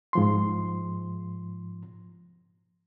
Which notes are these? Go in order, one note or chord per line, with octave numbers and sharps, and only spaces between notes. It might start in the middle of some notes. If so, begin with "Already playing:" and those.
G#2 F3 C6